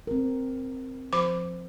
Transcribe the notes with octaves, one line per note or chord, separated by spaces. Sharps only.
C4 A#4
F3 D6